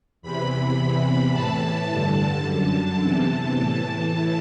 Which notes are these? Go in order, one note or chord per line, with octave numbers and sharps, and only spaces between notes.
E2 C3 E3 B5
E2 C3 E3
A2 E3 A5
G2 D3 A5
F#2 D3 A5
E2 C3 E3
A2 E3